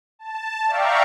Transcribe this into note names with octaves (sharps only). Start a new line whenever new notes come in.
A5
D5 E5 F5 G5 A#5 C#6